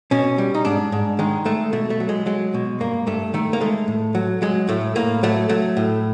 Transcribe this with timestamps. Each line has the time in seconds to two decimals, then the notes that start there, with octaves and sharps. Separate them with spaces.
0.11 B2 C#4
0.38 G3
0.54 D#4
0.65 G#2 D4
0.92 G#2
1.19 D#3 G#3
1.45 G#3 A3
1.73 B2 A3
1.90 A3
2.00 F#3
2.09 G#3
2.26 F#3 G#3
2.54 B2
2.80 G2 A#3
3.07 G2 A3
3.34 D#3 A3
3.53 A#3
3.61 G#3 A3
3.88 A2
4.15 F#3
4.42 F#3 G#3
4.69 A2 A3
4.96 A2 A#3
5.23 F#3 A3
5.49 F#3 A3
5.77 A2